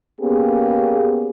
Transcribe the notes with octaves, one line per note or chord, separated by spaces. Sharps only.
A#3 B3 C#4 G4 G#4